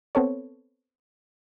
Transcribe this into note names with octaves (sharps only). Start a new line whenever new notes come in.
B3 C4 A4 C#5